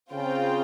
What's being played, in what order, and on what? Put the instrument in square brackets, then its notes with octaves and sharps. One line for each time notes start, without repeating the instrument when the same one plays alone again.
[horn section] C#3 [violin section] C4 F4 C5 G5